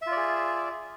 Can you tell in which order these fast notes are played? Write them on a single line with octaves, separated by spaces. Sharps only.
E5 F4 D5 G#4